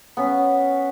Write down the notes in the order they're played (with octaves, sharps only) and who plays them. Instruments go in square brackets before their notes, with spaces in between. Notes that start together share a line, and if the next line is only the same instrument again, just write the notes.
[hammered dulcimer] B3 C#4